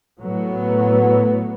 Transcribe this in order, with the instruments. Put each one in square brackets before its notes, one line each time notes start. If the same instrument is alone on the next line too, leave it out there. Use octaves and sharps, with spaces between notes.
[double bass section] A2 F#3 B3